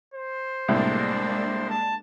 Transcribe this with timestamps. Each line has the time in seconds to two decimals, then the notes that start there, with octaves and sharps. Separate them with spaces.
0.14 C5
0.68 C2 A2 G#3 A#3 D4
1.70 A5